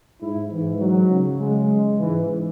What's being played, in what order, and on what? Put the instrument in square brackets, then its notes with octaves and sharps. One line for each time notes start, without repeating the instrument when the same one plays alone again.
[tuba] G#2 [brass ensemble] E4
[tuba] G#2 [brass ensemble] E3
[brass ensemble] F#3
[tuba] C#3
[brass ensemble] G#3
[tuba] G#2 [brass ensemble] E3